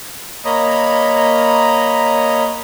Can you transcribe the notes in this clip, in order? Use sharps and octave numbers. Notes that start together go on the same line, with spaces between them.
A#3 C#5 D#5 A#5 B5 D#6